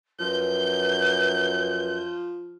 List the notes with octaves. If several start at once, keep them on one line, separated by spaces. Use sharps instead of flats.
F#2 F3 B4 G6